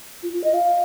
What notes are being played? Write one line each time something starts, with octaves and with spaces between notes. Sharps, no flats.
F4
F4
D#5
F5